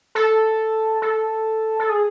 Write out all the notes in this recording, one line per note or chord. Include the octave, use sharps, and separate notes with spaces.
A4
A4
A4
G#4